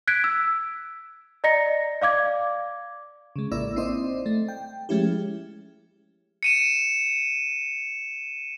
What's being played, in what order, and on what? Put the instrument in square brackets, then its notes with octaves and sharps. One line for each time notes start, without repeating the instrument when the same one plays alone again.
[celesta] F#6 G#6 B6 D7
E6
D5 D#5 A#5 A#6 C#7
D5 F5 D6 G#6
[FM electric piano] C#3 G#3
A1 A#3 E4 D5 E6
C4 D#4 E4 C5 D5 D#5
A3
G5
F3 G#3 A3 C#4 E4 G4
[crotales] C#7 D#7 E7